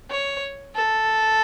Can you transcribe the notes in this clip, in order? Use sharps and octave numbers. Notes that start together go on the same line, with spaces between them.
C#5
A4